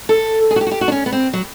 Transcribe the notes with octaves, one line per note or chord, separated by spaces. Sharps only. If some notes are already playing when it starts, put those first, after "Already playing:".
A4
G#4
F#4
G4
F#4
G4
F#4
D4
C#4
B3
C4
F#3